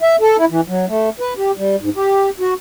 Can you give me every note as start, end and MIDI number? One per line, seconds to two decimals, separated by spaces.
0.01 0.16 76
0.21 0.37 69
0.37 0.45 64
0.50 0.61 52
0.68 0.85 54
0.88 1.09 57
1.20 1.34 71
1.37 1.51 67
1.57 1.76 55
1.81 1.90 44
1.96 2.30 67
2.40 2.54 66